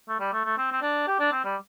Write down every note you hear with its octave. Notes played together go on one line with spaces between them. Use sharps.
A3
G3
A3
A3
C4
C4
D4
G4
D4
C4
G3